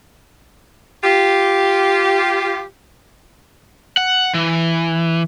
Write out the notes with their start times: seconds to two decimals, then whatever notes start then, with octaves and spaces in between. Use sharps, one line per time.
1.03 F4 G4
3.97 F#5
4.34 E3